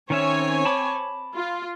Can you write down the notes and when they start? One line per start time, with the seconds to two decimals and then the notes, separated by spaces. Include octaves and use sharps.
0.10 D#3 C4 C#4 C#5 E5 G#5
0.65 A5 B5 D6
1.35 F4